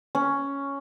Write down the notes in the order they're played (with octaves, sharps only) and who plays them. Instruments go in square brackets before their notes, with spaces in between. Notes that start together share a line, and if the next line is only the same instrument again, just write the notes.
[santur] C#4